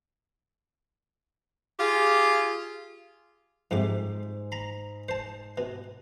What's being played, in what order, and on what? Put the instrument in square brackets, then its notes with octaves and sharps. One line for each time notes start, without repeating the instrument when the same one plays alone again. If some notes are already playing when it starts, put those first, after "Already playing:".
[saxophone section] F4 G4 G#4
[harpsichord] F2 C3 D6 [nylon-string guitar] G#2
[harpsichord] A#5 B5
C5 A5
B2